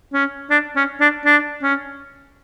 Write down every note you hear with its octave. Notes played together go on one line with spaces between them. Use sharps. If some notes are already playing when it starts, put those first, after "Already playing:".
C#4
D4
C#4
D4
D4
C#4